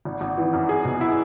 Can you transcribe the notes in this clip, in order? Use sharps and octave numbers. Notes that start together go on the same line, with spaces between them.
G#1
G#1
E3
F#2
G#4
B2
E4